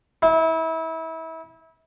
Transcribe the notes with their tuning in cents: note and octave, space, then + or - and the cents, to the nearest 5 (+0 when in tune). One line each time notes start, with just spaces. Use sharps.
E4 -30